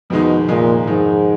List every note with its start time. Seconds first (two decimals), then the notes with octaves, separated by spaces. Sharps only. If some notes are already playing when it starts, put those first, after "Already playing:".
0.10 F2 B2 D#3 G#3 D#4
0.48 F2 A#2 D#3 G#3 D#4
0.87 F2 G#2 D#3 G#3 D#4